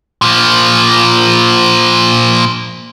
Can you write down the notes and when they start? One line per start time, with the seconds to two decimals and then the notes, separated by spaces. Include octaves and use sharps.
0.22 A#2 F3